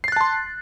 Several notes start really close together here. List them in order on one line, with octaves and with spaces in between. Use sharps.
C7 A6 F#6 A5 C6